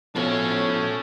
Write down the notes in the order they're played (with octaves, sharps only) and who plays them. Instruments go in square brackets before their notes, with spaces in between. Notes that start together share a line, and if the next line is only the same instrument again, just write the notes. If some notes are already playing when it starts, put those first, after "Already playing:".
[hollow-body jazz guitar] B2 F3 [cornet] C#4 [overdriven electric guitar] A4 C#5